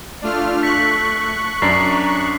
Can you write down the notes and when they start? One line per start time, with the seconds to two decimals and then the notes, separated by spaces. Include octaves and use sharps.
0.22 A3 D4 F4 F6
0.63 C#6 F#6 B6
1.62 F#2 D4 A#5 C7